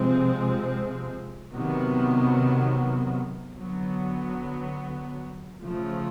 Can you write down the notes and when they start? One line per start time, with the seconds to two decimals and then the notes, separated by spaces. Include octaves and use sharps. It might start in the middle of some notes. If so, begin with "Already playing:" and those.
Already playing: C3 F3 G#3 C4
1.52 C3 D#3 F#3 B3
3.57 D3 F#3 B3
5.63 C#3 F3 A3